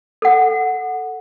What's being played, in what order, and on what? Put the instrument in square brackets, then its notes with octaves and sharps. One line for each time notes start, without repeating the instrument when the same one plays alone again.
[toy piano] A4 F#5